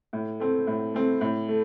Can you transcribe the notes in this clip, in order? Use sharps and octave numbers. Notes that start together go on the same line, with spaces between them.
A2
A3 C4
A2
A3 C4
A2
A3